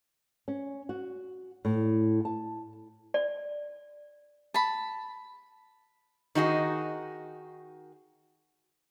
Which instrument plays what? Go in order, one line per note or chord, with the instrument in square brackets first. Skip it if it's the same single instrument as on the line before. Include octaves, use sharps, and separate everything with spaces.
[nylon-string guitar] C#4
F#4
A2
A5
[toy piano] D5
[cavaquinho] A5 B5
[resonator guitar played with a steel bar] D#3 D#4 F#4 G#4